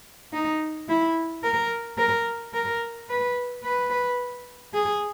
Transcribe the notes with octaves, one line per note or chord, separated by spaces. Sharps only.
D#4
E4
A#4
A#4
A#4
B4
B4
G#4